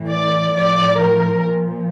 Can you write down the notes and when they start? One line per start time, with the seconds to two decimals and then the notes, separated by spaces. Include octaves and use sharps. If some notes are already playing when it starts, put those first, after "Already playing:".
Already playing: A2 E3
0.09 D5
0.53 A2 F3 D5
0.97 A#4
1.42 A#2 F3